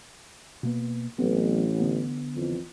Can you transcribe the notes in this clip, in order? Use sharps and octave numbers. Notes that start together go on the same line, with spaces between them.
B2 A#3 B3
A1 F#3 B3 C4
D3 B3
F2 E3